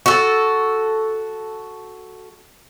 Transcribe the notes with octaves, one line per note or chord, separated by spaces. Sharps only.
F#4 A4